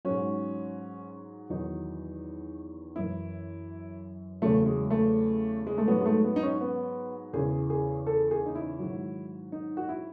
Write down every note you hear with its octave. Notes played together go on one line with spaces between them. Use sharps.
G#2 F#3 C#4
E2 D#3 F#3 D#4
F#2 E3 E4
E2 C#3 F#3 A3
G#3
A3
G#3
A3
G#2 F#3 B3
G#3
A3
B3
D#4
C#4
B3
E2 C#3 E3 G#4
G#4
A4
G#4
D#4
E4
G#2 D#3 F#3
D#4
F#4
E4